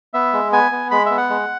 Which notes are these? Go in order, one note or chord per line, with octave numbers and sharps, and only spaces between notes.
B3 E5
G#3
B3 G#5
B3
G#3 B5
B3 E5
F#5
G#3